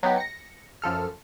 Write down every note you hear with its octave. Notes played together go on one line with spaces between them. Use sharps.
F#3 B3 D#4 G4
A#6 C#7
F#2 F3 A4 F6